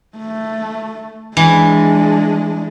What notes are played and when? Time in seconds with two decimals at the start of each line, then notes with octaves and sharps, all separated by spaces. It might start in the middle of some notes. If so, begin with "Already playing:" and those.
0.18 A3
1.37 E3 G#3 D4